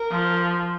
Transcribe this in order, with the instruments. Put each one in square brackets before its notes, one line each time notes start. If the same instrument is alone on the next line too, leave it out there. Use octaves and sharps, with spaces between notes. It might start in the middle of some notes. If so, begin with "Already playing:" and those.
Already playing: [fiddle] A#4
[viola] F3